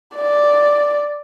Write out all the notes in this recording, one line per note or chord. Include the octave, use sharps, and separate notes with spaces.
D5